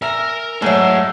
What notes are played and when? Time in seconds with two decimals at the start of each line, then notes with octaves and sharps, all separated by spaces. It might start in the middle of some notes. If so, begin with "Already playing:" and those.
0.02 A#4 E5 G#5 A#5
0.62 G#2 F#3 A3 G#4 E5 F#5